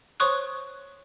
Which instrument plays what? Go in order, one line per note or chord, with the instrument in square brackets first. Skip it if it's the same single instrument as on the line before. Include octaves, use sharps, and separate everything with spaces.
[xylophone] C5 C#5 C6 C#6 D#6 F#6